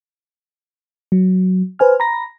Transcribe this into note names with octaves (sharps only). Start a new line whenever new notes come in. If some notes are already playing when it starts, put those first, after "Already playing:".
F#3
B4 C5 G#5 F6
A#5 B5 A#6